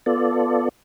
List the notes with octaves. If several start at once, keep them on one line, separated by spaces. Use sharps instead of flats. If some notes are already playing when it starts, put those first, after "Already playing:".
B3 F4 A4 D5